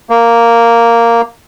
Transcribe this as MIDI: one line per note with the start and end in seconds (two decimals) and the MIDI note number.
0.10 1.21 58